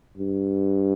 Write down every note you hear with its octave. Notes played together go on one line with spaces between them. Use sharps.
G2